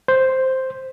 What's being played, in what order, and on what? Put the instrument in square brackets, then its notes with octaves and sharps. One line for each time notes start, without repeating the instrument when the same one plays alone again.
[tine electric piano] C5